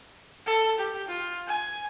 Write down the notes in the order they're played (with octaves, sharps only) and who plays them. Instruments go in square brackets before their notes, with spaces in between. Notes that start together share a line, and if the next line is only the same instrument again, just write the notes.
[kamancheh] A4
G4
F4
G#5